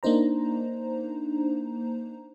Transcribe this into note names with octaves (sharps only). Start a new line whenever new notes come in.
A#3 D4 D#4 C5 A#5